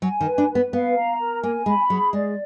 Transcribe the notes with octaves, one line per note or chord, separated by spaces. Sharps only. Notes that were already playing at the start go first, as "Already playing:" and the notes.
F#3 G#5
D#3
B4
D4
B4
B3
B3 F5
A#5
A#4
A#3 G#5
G#3 B5
F#3 G#4
G#3 D5